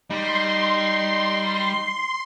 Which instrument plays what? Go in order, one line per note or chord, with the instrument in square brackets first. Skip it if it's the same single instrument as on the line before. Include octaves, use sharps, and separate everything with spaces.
[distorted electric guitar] G3 [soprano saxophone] D#4 [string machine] C6